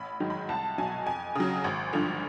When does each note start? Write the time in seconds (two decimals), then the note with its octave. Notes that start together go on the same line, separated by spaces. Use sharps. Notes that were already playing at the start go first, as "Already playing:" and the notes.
Already playing: A1 B5
0.20 G#2 D#3 F#3
0.30 B5
0.49 C2 A5
0.78 B2 F#3 G#5
1.06 F2 G#5
1.35 C#3 F#3
1.64 G#1
1.93 G2 D3 F3